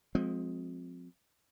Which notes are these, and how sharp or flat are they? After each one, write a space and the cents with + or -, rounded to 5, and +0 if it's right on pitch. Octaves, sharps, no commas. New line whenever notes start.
F3 +30 G#3 +15 C4 +0